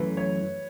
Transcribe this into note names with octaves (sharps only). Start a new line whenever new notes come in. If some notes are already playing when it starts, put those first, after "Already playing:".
Already playing: F#2 E3 A3 C#4 B4
C#5